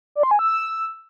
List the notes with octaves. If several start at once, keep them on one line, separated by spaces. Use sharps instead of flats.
D5
C6
G#5
E6